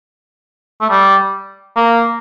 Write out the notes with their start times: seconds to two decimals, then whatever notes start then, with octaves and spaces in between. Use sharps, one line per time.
0.82 A3
0.90 G3
1.76 A#3